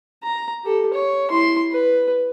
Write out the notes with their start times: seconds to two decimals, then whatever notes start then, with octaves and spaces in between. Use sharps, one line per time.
0.23 A#5
0.64 G4 A4
0.93 C#5
1.30 E4 C6
1.71 B4